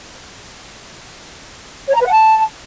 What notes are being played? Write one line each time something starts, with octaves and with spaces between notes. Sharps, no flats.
C#5
A#5
B4
F#5
A5